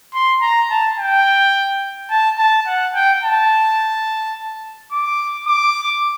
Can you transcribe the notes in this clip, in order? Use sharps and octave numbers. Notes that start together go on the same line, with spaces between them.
C6
A#5
A5
G5
A5
A5
F#5
G5
A5
D6
D6